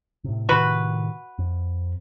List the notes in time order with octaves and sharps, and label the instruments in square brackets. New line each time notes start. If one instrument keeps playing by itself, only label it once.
[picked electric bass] A2 C3
[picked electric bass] A2 C3 D#3 [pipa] F#4 B4
[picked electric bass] F2